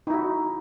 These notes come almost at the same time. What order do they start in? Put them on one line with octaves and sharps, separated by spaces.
D#4 E4 F#4